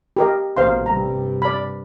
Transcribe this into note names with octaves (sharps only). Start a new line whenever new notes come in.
G4 A#4 D#5
A1 B2 A#3 C5 F5 C6
G2 C3 G3 A#5
D5 B5